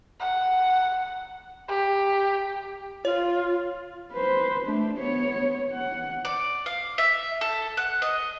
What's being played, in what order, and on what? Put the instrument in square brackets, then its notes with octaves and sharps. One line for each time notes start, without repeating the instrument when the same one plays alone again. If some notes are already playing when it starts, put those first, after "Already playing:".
[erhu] F#5
G4
[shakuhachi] F4 [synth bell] C#5
[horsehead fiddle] B4 C5
A3 D4
B3 C#5
F#5
[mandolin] D5
F5
E5
A4
F#5
D#5